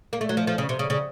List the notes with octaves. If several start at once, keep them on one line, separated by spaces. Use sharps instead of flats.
A#3
A3
F#3
F3
F3
C#3
C3
C#3
C#3